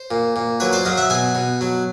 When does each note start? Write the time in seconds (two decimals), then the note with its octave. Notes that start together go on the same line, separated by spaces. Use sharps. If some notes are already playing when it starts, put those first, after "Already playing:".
Already playing: C5
0.11 A#2
0.36 A#2
0.60 F#3 B4 C#5
0.73 C5 D5
0.85 F#3 D#5 F5
0.98 E5 F#5
1.10 B2 F#5 G#5
1.35 B2
1.61 F#3